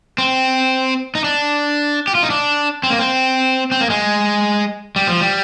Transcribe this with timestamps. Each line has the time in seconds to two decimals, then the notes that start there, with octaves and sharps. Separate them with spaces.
0.18 C4
1.15 D#4
1.24 D4
2.07 G4
2.15 F4
2.23 D#4
2.30 D4
2.83 C4
2.90 A#3
2.99 C4
3.72 C4
3.81 A#3
3.90 G#3
4.96 G3
5.08 F3
5.21 G3